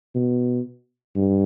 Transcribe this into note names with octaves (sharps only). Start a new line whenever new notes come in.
B2
G2